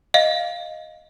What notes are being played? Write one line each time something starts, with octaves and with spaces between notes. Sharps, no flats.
D#5 F5